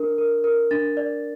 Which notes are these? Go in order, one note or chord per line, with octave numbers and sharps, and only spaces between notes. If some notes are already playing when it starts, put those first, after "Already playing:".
Already playing: D4 A#4
A#4
A#4
D4 A6
D5